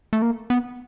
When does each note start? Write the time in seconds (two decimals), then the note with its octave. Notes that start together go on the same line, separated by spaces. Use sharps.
0.13 A3
0.22 A#3
0.50 B3